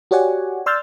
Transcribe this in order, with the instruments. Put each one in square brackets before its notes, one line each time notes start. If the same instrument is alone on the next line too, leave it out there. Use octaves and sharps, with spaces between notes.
[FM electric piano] F#4 G4 C#5 D5 F#5 G#5
D5 C6 E6 F6 G6 A6